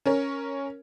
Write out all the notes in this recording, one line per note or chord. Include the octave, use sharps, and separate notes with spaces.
C#4 A#4 C#5